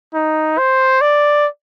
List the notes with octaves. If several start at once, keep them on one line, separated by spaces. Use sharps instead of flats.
D#4
C5
D5